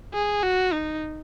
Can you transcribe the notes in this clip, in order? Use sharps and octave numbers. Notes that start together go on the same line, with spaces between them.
G#4
F#4
D#4